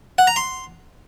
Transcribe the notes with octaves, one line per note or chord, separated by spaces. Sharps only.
F#5
A#5
C6